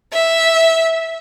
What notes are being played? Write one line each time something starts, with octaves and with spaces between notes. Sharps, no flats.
E5